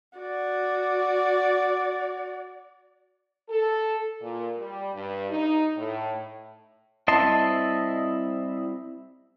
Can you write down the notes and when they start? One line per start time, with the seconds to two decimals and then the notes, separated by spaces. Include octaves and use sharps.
0.19 F#4 D5
3.49 A4
4.21 A#2
4.58 G3
4.94 G2
5.31 D#4
5.77 A2
7.08 G3 C4 E4 D#5 A5 C6